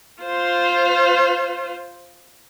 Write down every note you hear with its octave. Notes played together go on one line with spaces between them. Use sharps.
F4 C5